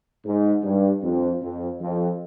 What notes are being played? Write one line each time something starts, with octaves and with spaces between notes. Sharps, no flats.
G#2
G2
F2
F2
F2